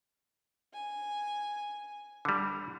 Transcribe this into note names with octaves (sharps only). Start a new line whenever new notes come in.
G#5
D3 G3